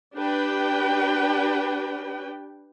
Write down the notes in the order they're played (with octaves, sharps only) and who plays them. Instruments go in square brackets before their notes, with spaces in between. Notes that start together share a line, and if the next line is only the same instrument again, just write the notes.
[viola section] D4 G4 B4 G5